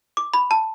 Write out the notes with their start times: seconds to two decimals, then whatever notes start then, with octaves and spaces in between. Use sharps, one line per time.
0.17 D6
0.34 B5
0.51 A5